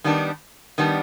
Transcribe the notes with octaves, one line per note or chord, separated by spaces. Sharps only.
D#3 G3 B3 D4
D#3 G3 B3 D4